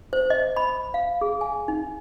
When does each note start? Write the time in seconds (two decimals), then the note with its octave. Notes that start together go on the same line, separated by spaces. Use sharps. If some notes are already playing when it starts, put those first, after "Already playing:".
0.13 C5
0.30 D#5
0.57 B5
0.94 F5
1.21 G#4
1.41 G#5
1.68 D#4